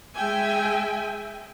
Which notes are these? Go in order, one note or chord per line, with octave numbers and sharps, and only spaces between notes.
G#3 E5 G5 G#5